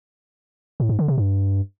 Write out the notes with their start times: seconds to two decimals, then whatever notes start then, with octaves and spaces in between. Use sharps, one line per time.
0.80 A2
0.89 G#2
0.99 D3
1.08 C3
1.18 G2